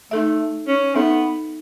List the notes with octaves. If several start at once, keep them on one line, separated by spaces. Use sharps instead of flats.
A3 D#4 A4 E5
C#4
B3 D#4 A4 E5